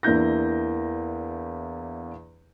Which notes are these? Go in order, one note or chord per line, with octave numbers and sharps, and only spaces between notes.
E2 A#3 D4 E4 G6 A#6